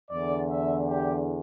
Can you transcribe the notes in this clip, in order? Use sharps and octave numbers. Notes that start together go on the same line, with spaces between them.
E2 D3 D5
E5
G4